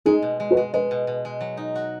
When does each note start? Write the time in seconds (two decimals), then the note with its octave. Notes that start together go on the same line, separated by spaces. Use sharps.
0.06 G#3 D#4 G#4
0.22 B2
0.40 G#3
0.51 F#4 B4
0.57 G#3
0.74 G#3 B4 D#5
0.91 B2
1.07 B2
1.25 G#3
1.41 F#3
1.57 D#4
1.75 F#4